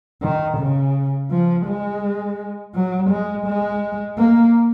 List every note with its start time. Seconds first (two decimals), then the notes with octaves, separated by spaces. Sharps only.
0.22 D#3
0.58 C#3
1.30 F3
1.66 G#3
2.75 F#3
3.10 G#3
3.46 G#3
4.18 A#3